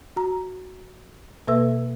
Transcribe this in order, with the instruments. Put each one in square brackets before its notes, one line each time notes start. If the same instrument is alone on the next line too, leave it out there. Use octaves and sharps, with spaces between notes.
[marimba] F#4 A#5
B2 A#3 A4 B4 E5 E6